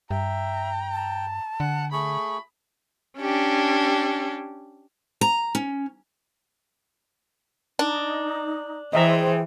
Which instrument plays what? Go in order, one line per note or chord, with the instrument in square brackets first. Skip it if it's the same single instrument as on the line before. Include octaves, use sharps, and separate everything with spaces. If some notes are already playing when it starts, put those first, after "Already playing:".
[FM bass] G2 [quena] E5 [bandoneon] G5 [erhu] A#5
[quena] A5
[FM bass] D3 [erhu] F#5
[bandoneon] A3 G#4 [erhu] B5 [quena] C#6
[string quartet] C#4 D4 G4
[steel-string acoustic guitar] A#5
C#4
[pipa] D4 [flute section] D#4
[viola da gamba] E3 [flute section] G#4 C5 G5 [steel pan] D#5 E5 A#5